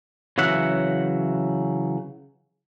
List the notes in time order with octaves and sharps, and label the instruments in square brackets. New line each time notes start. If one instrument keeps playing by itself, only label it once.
[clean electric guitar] C#3 E3 F#3 E5 F#5